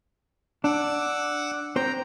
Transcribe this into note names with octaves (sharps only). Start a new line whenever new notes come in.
D4 F#5 D6 E6
C4 C5 G5 A#5